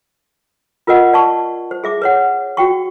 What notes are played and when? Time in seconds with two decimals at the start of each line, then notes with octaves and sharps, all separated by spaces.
0.87 F4 A#4 B4 D#5 F#5
1.13 D5 A5 C#6
1.71 C5
1.84 G#4 E5 D6
2.02 B4 C#5 F#5
2.57 F#4 G5 C#6